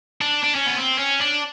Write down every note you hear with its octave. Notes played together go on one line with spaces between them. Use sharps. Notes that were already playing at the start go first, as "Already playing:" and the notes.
D4
D4
C#4
B3
C4
C#4
D4